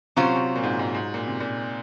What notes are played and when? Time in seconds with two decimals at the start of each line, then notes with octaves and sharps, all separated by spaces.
0.17 C3 F#3 C#4 F4 C5
0.36 C3
0.56 A#2
0.63 G#2
0.79 G#2
0.95 G#2
1.14 A#2
1.28 C3
1.40 A#2